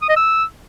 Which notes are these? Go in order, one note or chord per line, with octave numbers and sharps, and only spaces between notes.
D#6
D#5
E6